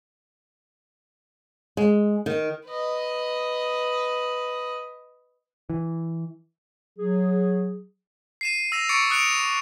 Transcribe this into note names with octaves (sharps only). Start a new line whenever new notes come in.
G#3
D#3
B4 D#5
E3
F#3 G#4
C7 D#7 E7
E6 A#6 E7 F7
C#6 D6 A6 C#7 D7
D#6 F#6 C#7 D7 F7